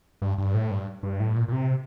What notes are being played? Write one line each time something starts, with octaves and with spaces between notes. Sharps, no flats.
G2
G2
A2
G2
G2
A2
A#2
A#2
C3